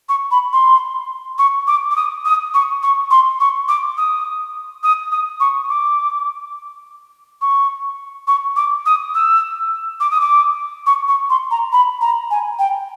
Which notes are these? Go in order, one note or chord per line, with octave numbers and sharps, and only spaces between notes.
C#6
B5
C6
C#6
D6
D6
D#6
D#6
C#6
C#6
C6
C#6
D6
D#6
D#6
D#6
C#6
D6
C#6
C#6
D6
D#6
E6
D6
D#6
D6
C#6
C#6
C6
A#5
B5
A#5
G#5
G5